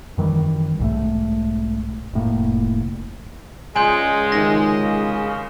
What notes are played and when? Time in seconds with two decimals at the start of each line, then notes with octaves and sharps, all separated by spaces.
0.18 F#2 D#3 E3 G3
0.79 B1 G#2 A3
2.14 F1 A2 A#3
3.76 C#2 G#3 G#4 D5 D#5 G#5 C6 G6
4.32 G#2 C3 D#3 A#6
4.79 C#3